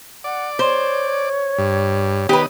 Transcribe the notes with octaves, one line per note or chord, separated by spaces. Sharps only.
D5 F#5
C5 C#5
G2
D#3 B3 G4 B4 D#6